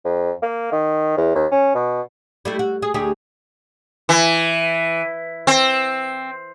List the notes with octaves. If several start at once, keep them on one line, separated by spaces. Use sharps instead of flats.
F2
A#3
D#3
E2
D#2
C#4
B2
G3 A3 E4
F#4
G#4
D2 G4 G#4
E3
C4